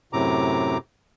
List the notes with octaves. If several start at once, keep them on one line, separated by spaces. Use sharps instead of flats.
F#2 A2 C3 A#5 D6